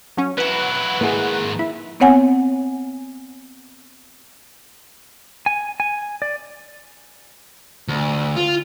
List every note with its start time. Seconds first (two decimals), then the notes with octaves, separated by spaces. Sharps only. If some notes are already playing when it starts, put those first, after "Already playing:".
0.17 F#3 C#4
0.38 F#3 E4 B4 F#5
1.01 G#2 D#3 A#3 E4 G#4
1.59 E4 B5
2.00 B3 C4 C#5 F#5 G#5
5.46 G#5
5.80 G#5
6.22 D5
7.88 D2
8.36 F4